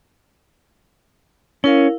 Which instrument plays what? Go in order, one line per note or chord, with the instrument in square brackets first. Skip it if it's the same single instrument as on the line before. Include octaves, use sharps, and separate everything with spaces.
[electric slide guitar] C#4 [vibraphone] E4 A#4 F5